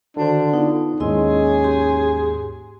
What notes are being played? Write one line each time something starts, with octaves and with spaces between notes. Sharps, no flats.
D3 D#3 D4 F#4 C5
B3 D#4 F4
D#2 G#2 C#4 E4 G#4 D#5 C6
G4 C6